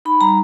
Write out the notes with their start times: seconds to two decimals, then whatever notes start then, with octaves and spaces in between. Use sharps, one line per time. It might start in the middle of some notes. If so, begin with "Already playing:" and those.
0.05 D#4 B5
0.21 G3 A#5